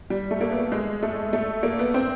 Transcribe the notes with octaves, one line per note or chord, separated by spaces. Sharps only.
G3
A3
A#3
B3
G#3
A3
A3
A#3
B3
C4